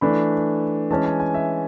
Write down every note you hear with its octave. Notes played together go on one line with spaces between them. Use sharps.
E3 A3 D4 B5
E3 G#3 C#4 A5
G#5
G#5
E5